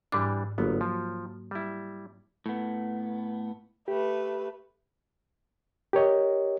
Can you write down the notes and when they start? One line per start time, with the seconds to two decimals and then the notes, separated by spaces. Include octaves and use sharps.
0.12 G#2 E3 G3 D4 D6
0.58 G1 F#3 A#3 B3
0.81 F3
1.51 G3 E4
2.46 A2 B3
3.88 A3 G4 B4
5.93 G4 A#4 C#5 D#5